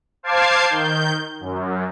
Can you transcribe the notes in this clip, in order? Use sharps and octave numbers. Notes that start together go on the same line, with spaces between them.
C5 F5 A5 D6 G#6 C7
D#3 G6
F#2